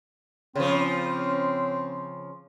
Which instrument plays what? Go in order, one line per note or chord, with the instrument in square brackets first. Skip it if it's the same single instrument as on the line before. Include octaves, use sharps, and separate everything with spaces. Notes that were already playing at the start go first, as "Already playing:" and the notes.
[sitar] C#3 F3 [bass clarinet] C4